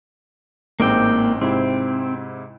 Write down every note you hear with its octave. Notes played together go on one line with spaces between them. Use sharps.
A1 G#2 A#3 C4 D5 G5
G#2 C3 C4 E4